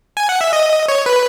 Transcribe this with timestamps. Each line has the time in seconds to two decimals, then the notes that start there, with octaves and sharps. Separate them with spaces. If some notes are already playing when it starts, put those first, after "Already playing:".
0.17 G#5
0.29 F#5
0.41 E5
0.53 D#5
0.88 C#5
1.06 B4